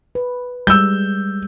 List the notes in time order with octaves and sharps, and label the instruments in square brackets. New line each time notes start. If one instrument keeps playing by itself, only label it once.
[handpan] B4
[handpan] G3 G#3 [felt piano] E6 G6